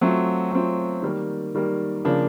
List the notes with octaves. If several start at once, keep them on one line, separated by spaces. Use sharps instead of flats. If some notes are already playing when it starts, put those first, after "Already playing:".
F#3 A3 C4 F4
F#3 A3 C4 F4
D#3 G3 A#3
D#3 G3 A#3
C#3 F3 A#3 D4